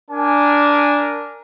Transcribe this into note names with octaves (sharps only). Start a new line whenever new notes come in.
D4 A#4 G#5